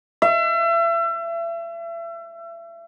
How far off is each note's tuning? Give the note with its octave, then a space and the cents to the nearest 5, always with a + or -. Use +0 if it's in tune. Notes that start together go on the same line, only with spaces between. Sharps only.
E5 +35